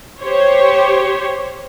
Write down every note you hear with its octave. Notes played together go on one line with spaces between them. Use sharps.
G4 C5 C#5